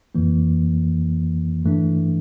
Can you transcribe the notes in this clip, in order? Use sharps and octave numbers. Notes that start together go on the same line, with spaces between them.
F2 E3 A#3
G2 E3 A3 D4